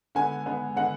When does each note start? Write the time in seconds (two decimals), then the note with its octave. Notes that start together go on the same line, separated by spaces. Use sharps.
0.15 D3 G#3 B3 G#5
0.46 D3 G#3 B3
0.76 D3 G#3 B3 F#5